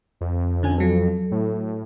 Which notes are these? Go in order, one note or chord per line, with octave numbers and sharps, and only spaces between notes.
F2
D3 C#4 G#5
F#3 A4
A2